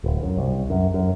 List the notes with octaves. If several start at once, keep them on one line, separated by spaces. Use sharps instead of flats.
D1
F#2
C2
F#2
F#2